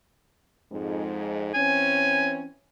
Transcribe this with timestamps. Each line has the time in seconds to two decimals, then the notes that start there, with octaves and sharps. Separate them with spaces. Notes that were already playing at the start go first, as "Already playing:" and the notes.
0.71 F2 G#2
1.54 E3 C4 C#4 G#5